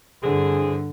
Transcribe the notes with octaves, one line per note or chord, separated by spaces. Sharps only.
G2 D3 E3 C4 G#4